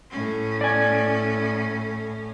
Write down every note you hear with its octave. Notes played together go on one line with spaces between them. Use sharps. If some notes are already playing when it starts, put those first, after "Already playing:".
A2 C#4
D5 G#5